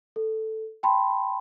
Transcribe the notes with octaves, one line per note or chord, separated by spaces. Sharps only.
A4
G5 A5 B5 C6